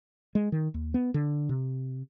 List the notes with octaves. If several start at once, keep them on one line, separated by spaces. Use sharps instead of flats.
G#3
D#3
D#2
B3
D3
C3